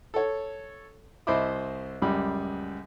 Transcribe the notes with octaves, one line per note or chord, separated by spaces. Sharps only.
A4 C#5
C2 C5 D#5 E5 B5 D6
C#2 F#2 G3